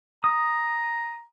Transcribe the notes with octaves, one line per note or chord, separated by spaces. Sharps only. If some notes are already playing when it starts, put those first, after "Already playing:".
A#5 D#6